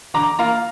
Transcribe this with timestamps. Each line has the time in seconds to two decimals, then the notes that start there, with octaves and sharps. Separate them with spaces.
0.14 D3 A#5 D6
0.39 A#3 F4 F5 A#5